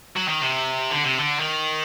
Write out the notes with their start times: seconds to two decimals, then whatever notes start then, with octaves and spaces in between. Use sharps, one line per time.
0.16 F#3
0.28 D#3
0.41 C3
0.90 D3
1.04 C3
1.18 D3
1.39 D#3